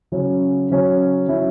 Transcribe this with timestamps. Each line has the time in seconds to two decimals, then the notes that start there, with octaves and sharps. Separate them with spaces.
0.12 C#3 F#3 C#4
0.70 C#3 F#3 C#4
1.28 F#3 C#4 E4